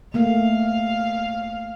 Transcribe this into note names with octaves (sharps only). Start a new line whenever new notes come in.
A3 A#3 F5